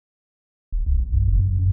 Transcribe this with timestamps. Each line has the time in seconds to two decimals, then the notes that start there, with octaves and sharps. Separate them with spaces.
0.72 D1
0.86 C#2
1.00 A#1
1.14 F#2
1.28 F#1
1.39 F#2
1.59 F#2